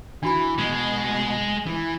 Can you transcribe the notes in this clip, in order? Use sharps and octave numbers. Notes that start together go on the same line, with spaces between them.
E3 D4 F#4 B5
B2 G#3
E3